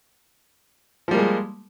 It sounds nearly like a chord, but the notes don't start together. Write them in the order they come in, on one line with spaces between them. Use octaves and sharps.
F3 G3 A#3 G#3